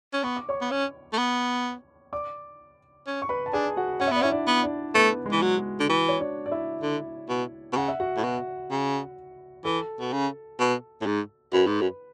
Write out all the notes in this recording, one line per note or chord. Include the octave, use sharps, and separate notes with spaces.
C#4
B3 C#6
D6
C#5 C#6
B3
C#4
A3
B3
D5 D6
C#4
C#6
B4 B5
A5
D4 G#4 G#5
F#4 F#5
C#4 F#5
E5
B3 D5
C#4 E4 E5
D4 D5
B3
D4 D5
A3 B3 B4
G#3 G#4
E3
F#3
F#4
D3
E3 F#4
C#5
D4 D5
D5
E4 E5
D3
B2
B2
C#3 F#5
E5
F#4 F#5
A2
B2
C#3
E3 A4 A5
B2
C#3
B2
A2
G#2
F#2 B4 B5
G#2
F#2